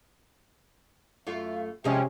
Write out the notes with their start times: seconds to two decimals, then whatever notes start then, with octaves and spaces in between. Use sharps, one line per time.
1.27 F#2 A3 F4 E5 F5
1.84 C3 F3 G#3 C#4 D#5 E5 G5